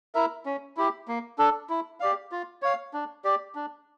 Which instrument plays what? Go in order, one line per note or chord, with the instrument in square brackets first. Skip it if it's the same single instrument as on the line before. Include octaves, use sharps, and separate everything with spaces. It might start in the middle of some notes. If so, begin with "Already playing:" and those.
[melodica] E4 A#4 E5
C#4
E4 G4
A#3
D4 A4
E4
G4 D5 F5
F4
C#5 F5
D4
G4 D5
D4